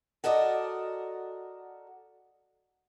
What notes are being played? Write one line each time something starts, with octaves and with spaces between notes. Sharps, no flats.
F#4 A4 A#4 D5 D#5